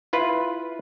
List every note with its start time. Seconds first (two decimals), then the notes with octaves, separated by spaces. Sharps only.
0.13 E4 F4 B4